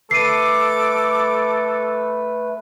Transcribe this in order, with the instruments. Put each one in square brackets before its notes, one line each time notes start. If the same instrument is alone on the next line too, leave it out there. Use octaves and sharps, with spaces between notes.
[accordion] A3 B4 [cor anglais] A4 [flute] D6 [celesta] C7 D#7